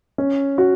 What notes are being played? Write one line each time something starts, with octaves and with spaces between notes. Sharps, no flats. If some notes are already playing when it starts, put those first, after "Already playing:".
C#4
F#4